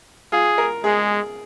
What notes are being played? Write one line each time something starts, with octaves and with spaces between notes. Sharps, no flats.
F4 G#4
A#4
G#3 G#4